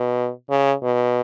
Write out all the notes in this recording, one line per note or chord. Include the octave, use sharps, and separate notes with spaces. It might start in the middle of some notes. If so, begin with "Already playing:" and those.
Already playing: B2
C#3
B2